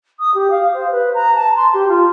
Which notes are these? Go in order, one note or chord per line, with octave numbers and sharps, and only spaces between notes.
D#6
G4
F5
C5
B4
A#5
A5
C6
G4
F4